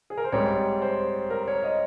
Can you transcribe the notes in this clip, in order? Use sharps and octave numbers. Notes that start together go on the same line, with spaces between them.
G#4
A#4
C5
G#2 G3 C4 C#5
C5
A#4
C#5
D#5